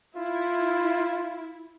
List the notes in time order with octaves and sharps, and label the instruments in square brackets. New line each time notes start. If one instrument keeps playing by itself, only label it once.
[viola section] E4 [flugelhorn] F4